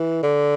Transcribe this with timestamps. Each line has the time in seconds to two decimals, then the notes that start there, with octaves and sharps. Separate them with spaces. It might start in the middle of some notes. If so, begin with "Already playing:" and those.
Already playing: E3
0.23 D3